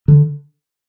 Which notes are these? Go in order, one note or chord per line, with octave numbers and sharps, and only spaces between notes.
D3